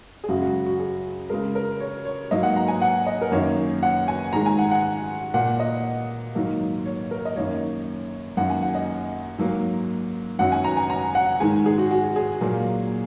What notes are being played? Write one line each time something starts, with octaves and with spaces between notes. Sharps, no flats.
G#4
F#2 C#3 G#3 F#4
F#4
F#4
G#4
C#3 G#3 A#4
A#4
C#5
C#5
G#2 F#3 A#3 D#5
F#5
A#5
G#5
F#5
D#5
A#4
F#2 D#3 A#3 C#5
F#5
G#5
G#2 D#3 G#3 A#5
G#5
F#5
F#5
A#2 A#3 F#5
D#5
G#2 D#3 F#3 A#3
C#5
A#4
D#5
F#2 D#3 A#3 C#5
F#2 D#3 F#3 A#3 F#5
G#5
F#5
D#5
G#2 F#3 A#3
F#2 D#3 F#3 F#5
G#5
A#5
G#5
A#5
F#5
G#2 D#3 G#3 G#5
G#4
F#4
F#4
G#4
A#2 F#3 A#3